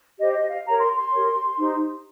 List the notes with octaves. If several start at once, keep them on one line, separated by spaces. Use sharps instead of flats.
G4 C5 D#5
D#5
F5
G4 A#4 C#5 A#5
C6
C6
G4 A#4 C#5
D#4 G4 C5